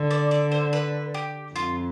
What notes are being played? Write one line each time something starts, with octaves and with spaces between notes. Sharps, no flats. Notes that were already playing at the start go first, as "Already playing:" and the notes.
Already playing: D3
D5
D5
C5
B4
G4
F2 F4